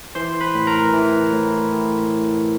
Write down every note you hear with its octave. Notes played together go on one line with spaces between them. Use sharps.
E3 C5 C6
B4 B5
A2
A#4 A#5
E3
A2
A2